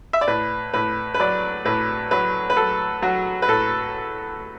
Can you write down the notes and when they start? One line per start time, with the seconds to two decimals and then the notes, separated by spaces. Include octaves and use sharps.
0.13 E5
0.21 D5
0.27 A2 B4
0.74 A2 B4
1.14 B4
1.19 F#3 D5
1.65 A2 B4
2.11 F#3 B4
2.50 B4
2.56 F#3 A4
3.02 F#3 F#4
3.42 B4
3.48 A2 A4